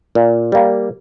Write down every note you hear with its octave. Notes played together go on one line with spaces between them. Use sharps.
A#2
G3 A#3